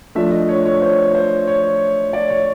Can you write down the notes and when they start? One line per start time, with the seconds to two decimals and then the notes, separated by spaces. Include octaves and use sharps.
0.15 F3 A3 D4 E5
0.32 D#5
0.49 C#5
0.66 C#5
0.82 C5
1.15 C5
1.47 C#5
2.13 D5
2.30 C#5